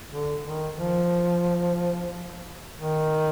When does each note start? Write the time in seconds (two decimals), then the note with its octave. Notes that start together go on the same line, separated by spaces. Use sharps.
0.12 D3
0.44 D#3
0.78 F3
2.79 D#3